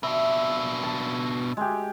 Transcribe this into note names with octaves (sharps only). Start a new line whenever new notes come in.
B2 D4 E5
A5
G#3 G4